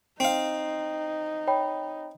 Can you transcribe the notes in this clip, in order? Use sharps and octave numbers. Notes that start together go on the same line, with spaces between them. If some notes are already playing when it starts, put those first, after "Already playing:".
C4 D#4 F5
C#5 G5 B5